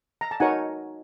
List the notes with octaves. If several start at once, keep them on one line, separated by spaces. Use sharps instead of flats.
A#5
A5
D#4 F#4 A#4 C#5 F#5 G#5